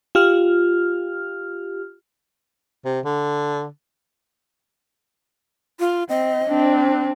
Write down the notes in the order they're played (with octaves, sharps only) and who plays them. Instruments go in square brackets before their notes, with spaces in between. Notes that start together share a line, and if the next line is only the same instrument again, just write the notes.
[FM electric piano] F4 G4 F6
[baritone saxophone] C3
D3
[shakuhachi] F4
[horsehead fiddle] C4 [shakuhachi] D#5
[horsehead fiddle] C4 D4